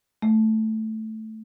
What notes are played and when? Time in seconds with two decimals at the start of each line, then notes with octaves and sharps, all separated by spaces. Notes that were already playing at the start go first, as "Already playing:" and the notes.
0.22 A3